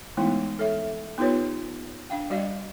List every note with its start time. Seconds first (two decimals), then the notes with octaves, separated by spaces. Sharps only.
0.17 E3 G#3 A3 B3 D#4 E4
0.59 A4 C#5 E5
1.18 B3 D#4 F4 G4 B4 C#5
2.10 D4 F5 G5
2.30 G3 F#4 D5 D#5 F5